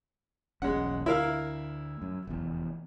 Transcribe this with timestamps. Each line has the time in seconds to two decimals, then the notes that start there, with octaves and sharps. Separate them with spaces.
0.62 E1 B1 G#3 C#4 F#5
1.06 D2 E4 A#4 F5
2.02 F#2
2.27 F1 E2